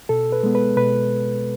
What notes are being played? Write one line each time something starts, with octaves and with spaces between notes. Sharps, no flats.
B2 A4
B4
G#3 B3
B4
B2 B4